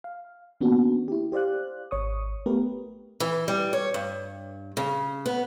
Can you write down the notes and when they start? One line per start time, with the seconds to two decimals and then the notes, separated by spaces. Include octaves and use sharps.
0.04 F5
0.61 D#3 A#3 B3 C#4 D4 F#4
1.08 E4 G4
1.32 G4 C5 D5 F5 F#6
1.91 G#1 C#5 C#6 D#6
2.46 A3 B3 G4 A#4 B4
3.20 E3
3.48 G3
3.73 C#5
3.94 G2
4.77 C#3
5.26 B3